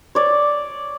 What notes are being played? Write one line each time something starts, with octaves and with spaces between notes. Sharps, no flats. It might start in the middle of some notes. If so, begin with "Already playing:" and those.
C#5 D5